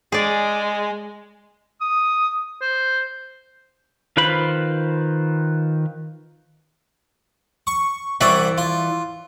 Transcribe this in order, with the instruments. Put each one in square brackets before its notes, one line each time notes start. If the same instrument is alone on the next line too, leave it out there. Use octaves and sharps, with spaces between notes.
[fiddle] G#3 [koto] G#4 D5
[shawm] D#6
C5
[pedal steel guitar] D#3 F4 B4 C5 B5
[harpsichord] C#6
[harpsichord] C2 F#4 E5 [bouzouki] E3 D5
[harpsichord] F4